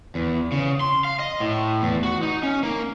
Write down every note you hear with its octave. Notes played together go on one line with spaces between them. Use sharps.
E2
C#3
C6
F5
D#5
A2
E2
F#4
D#4
C#4
A#3